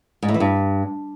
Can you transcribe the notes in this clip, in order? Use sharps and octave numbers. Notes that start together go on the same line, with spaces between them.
G#2
A2
E3
G2